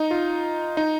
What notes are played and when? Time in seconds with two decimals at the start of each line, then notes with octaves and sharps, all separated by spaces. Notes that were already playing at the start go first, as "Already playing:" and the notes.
Already playing: D#4
0.11 F4
0.77 D#4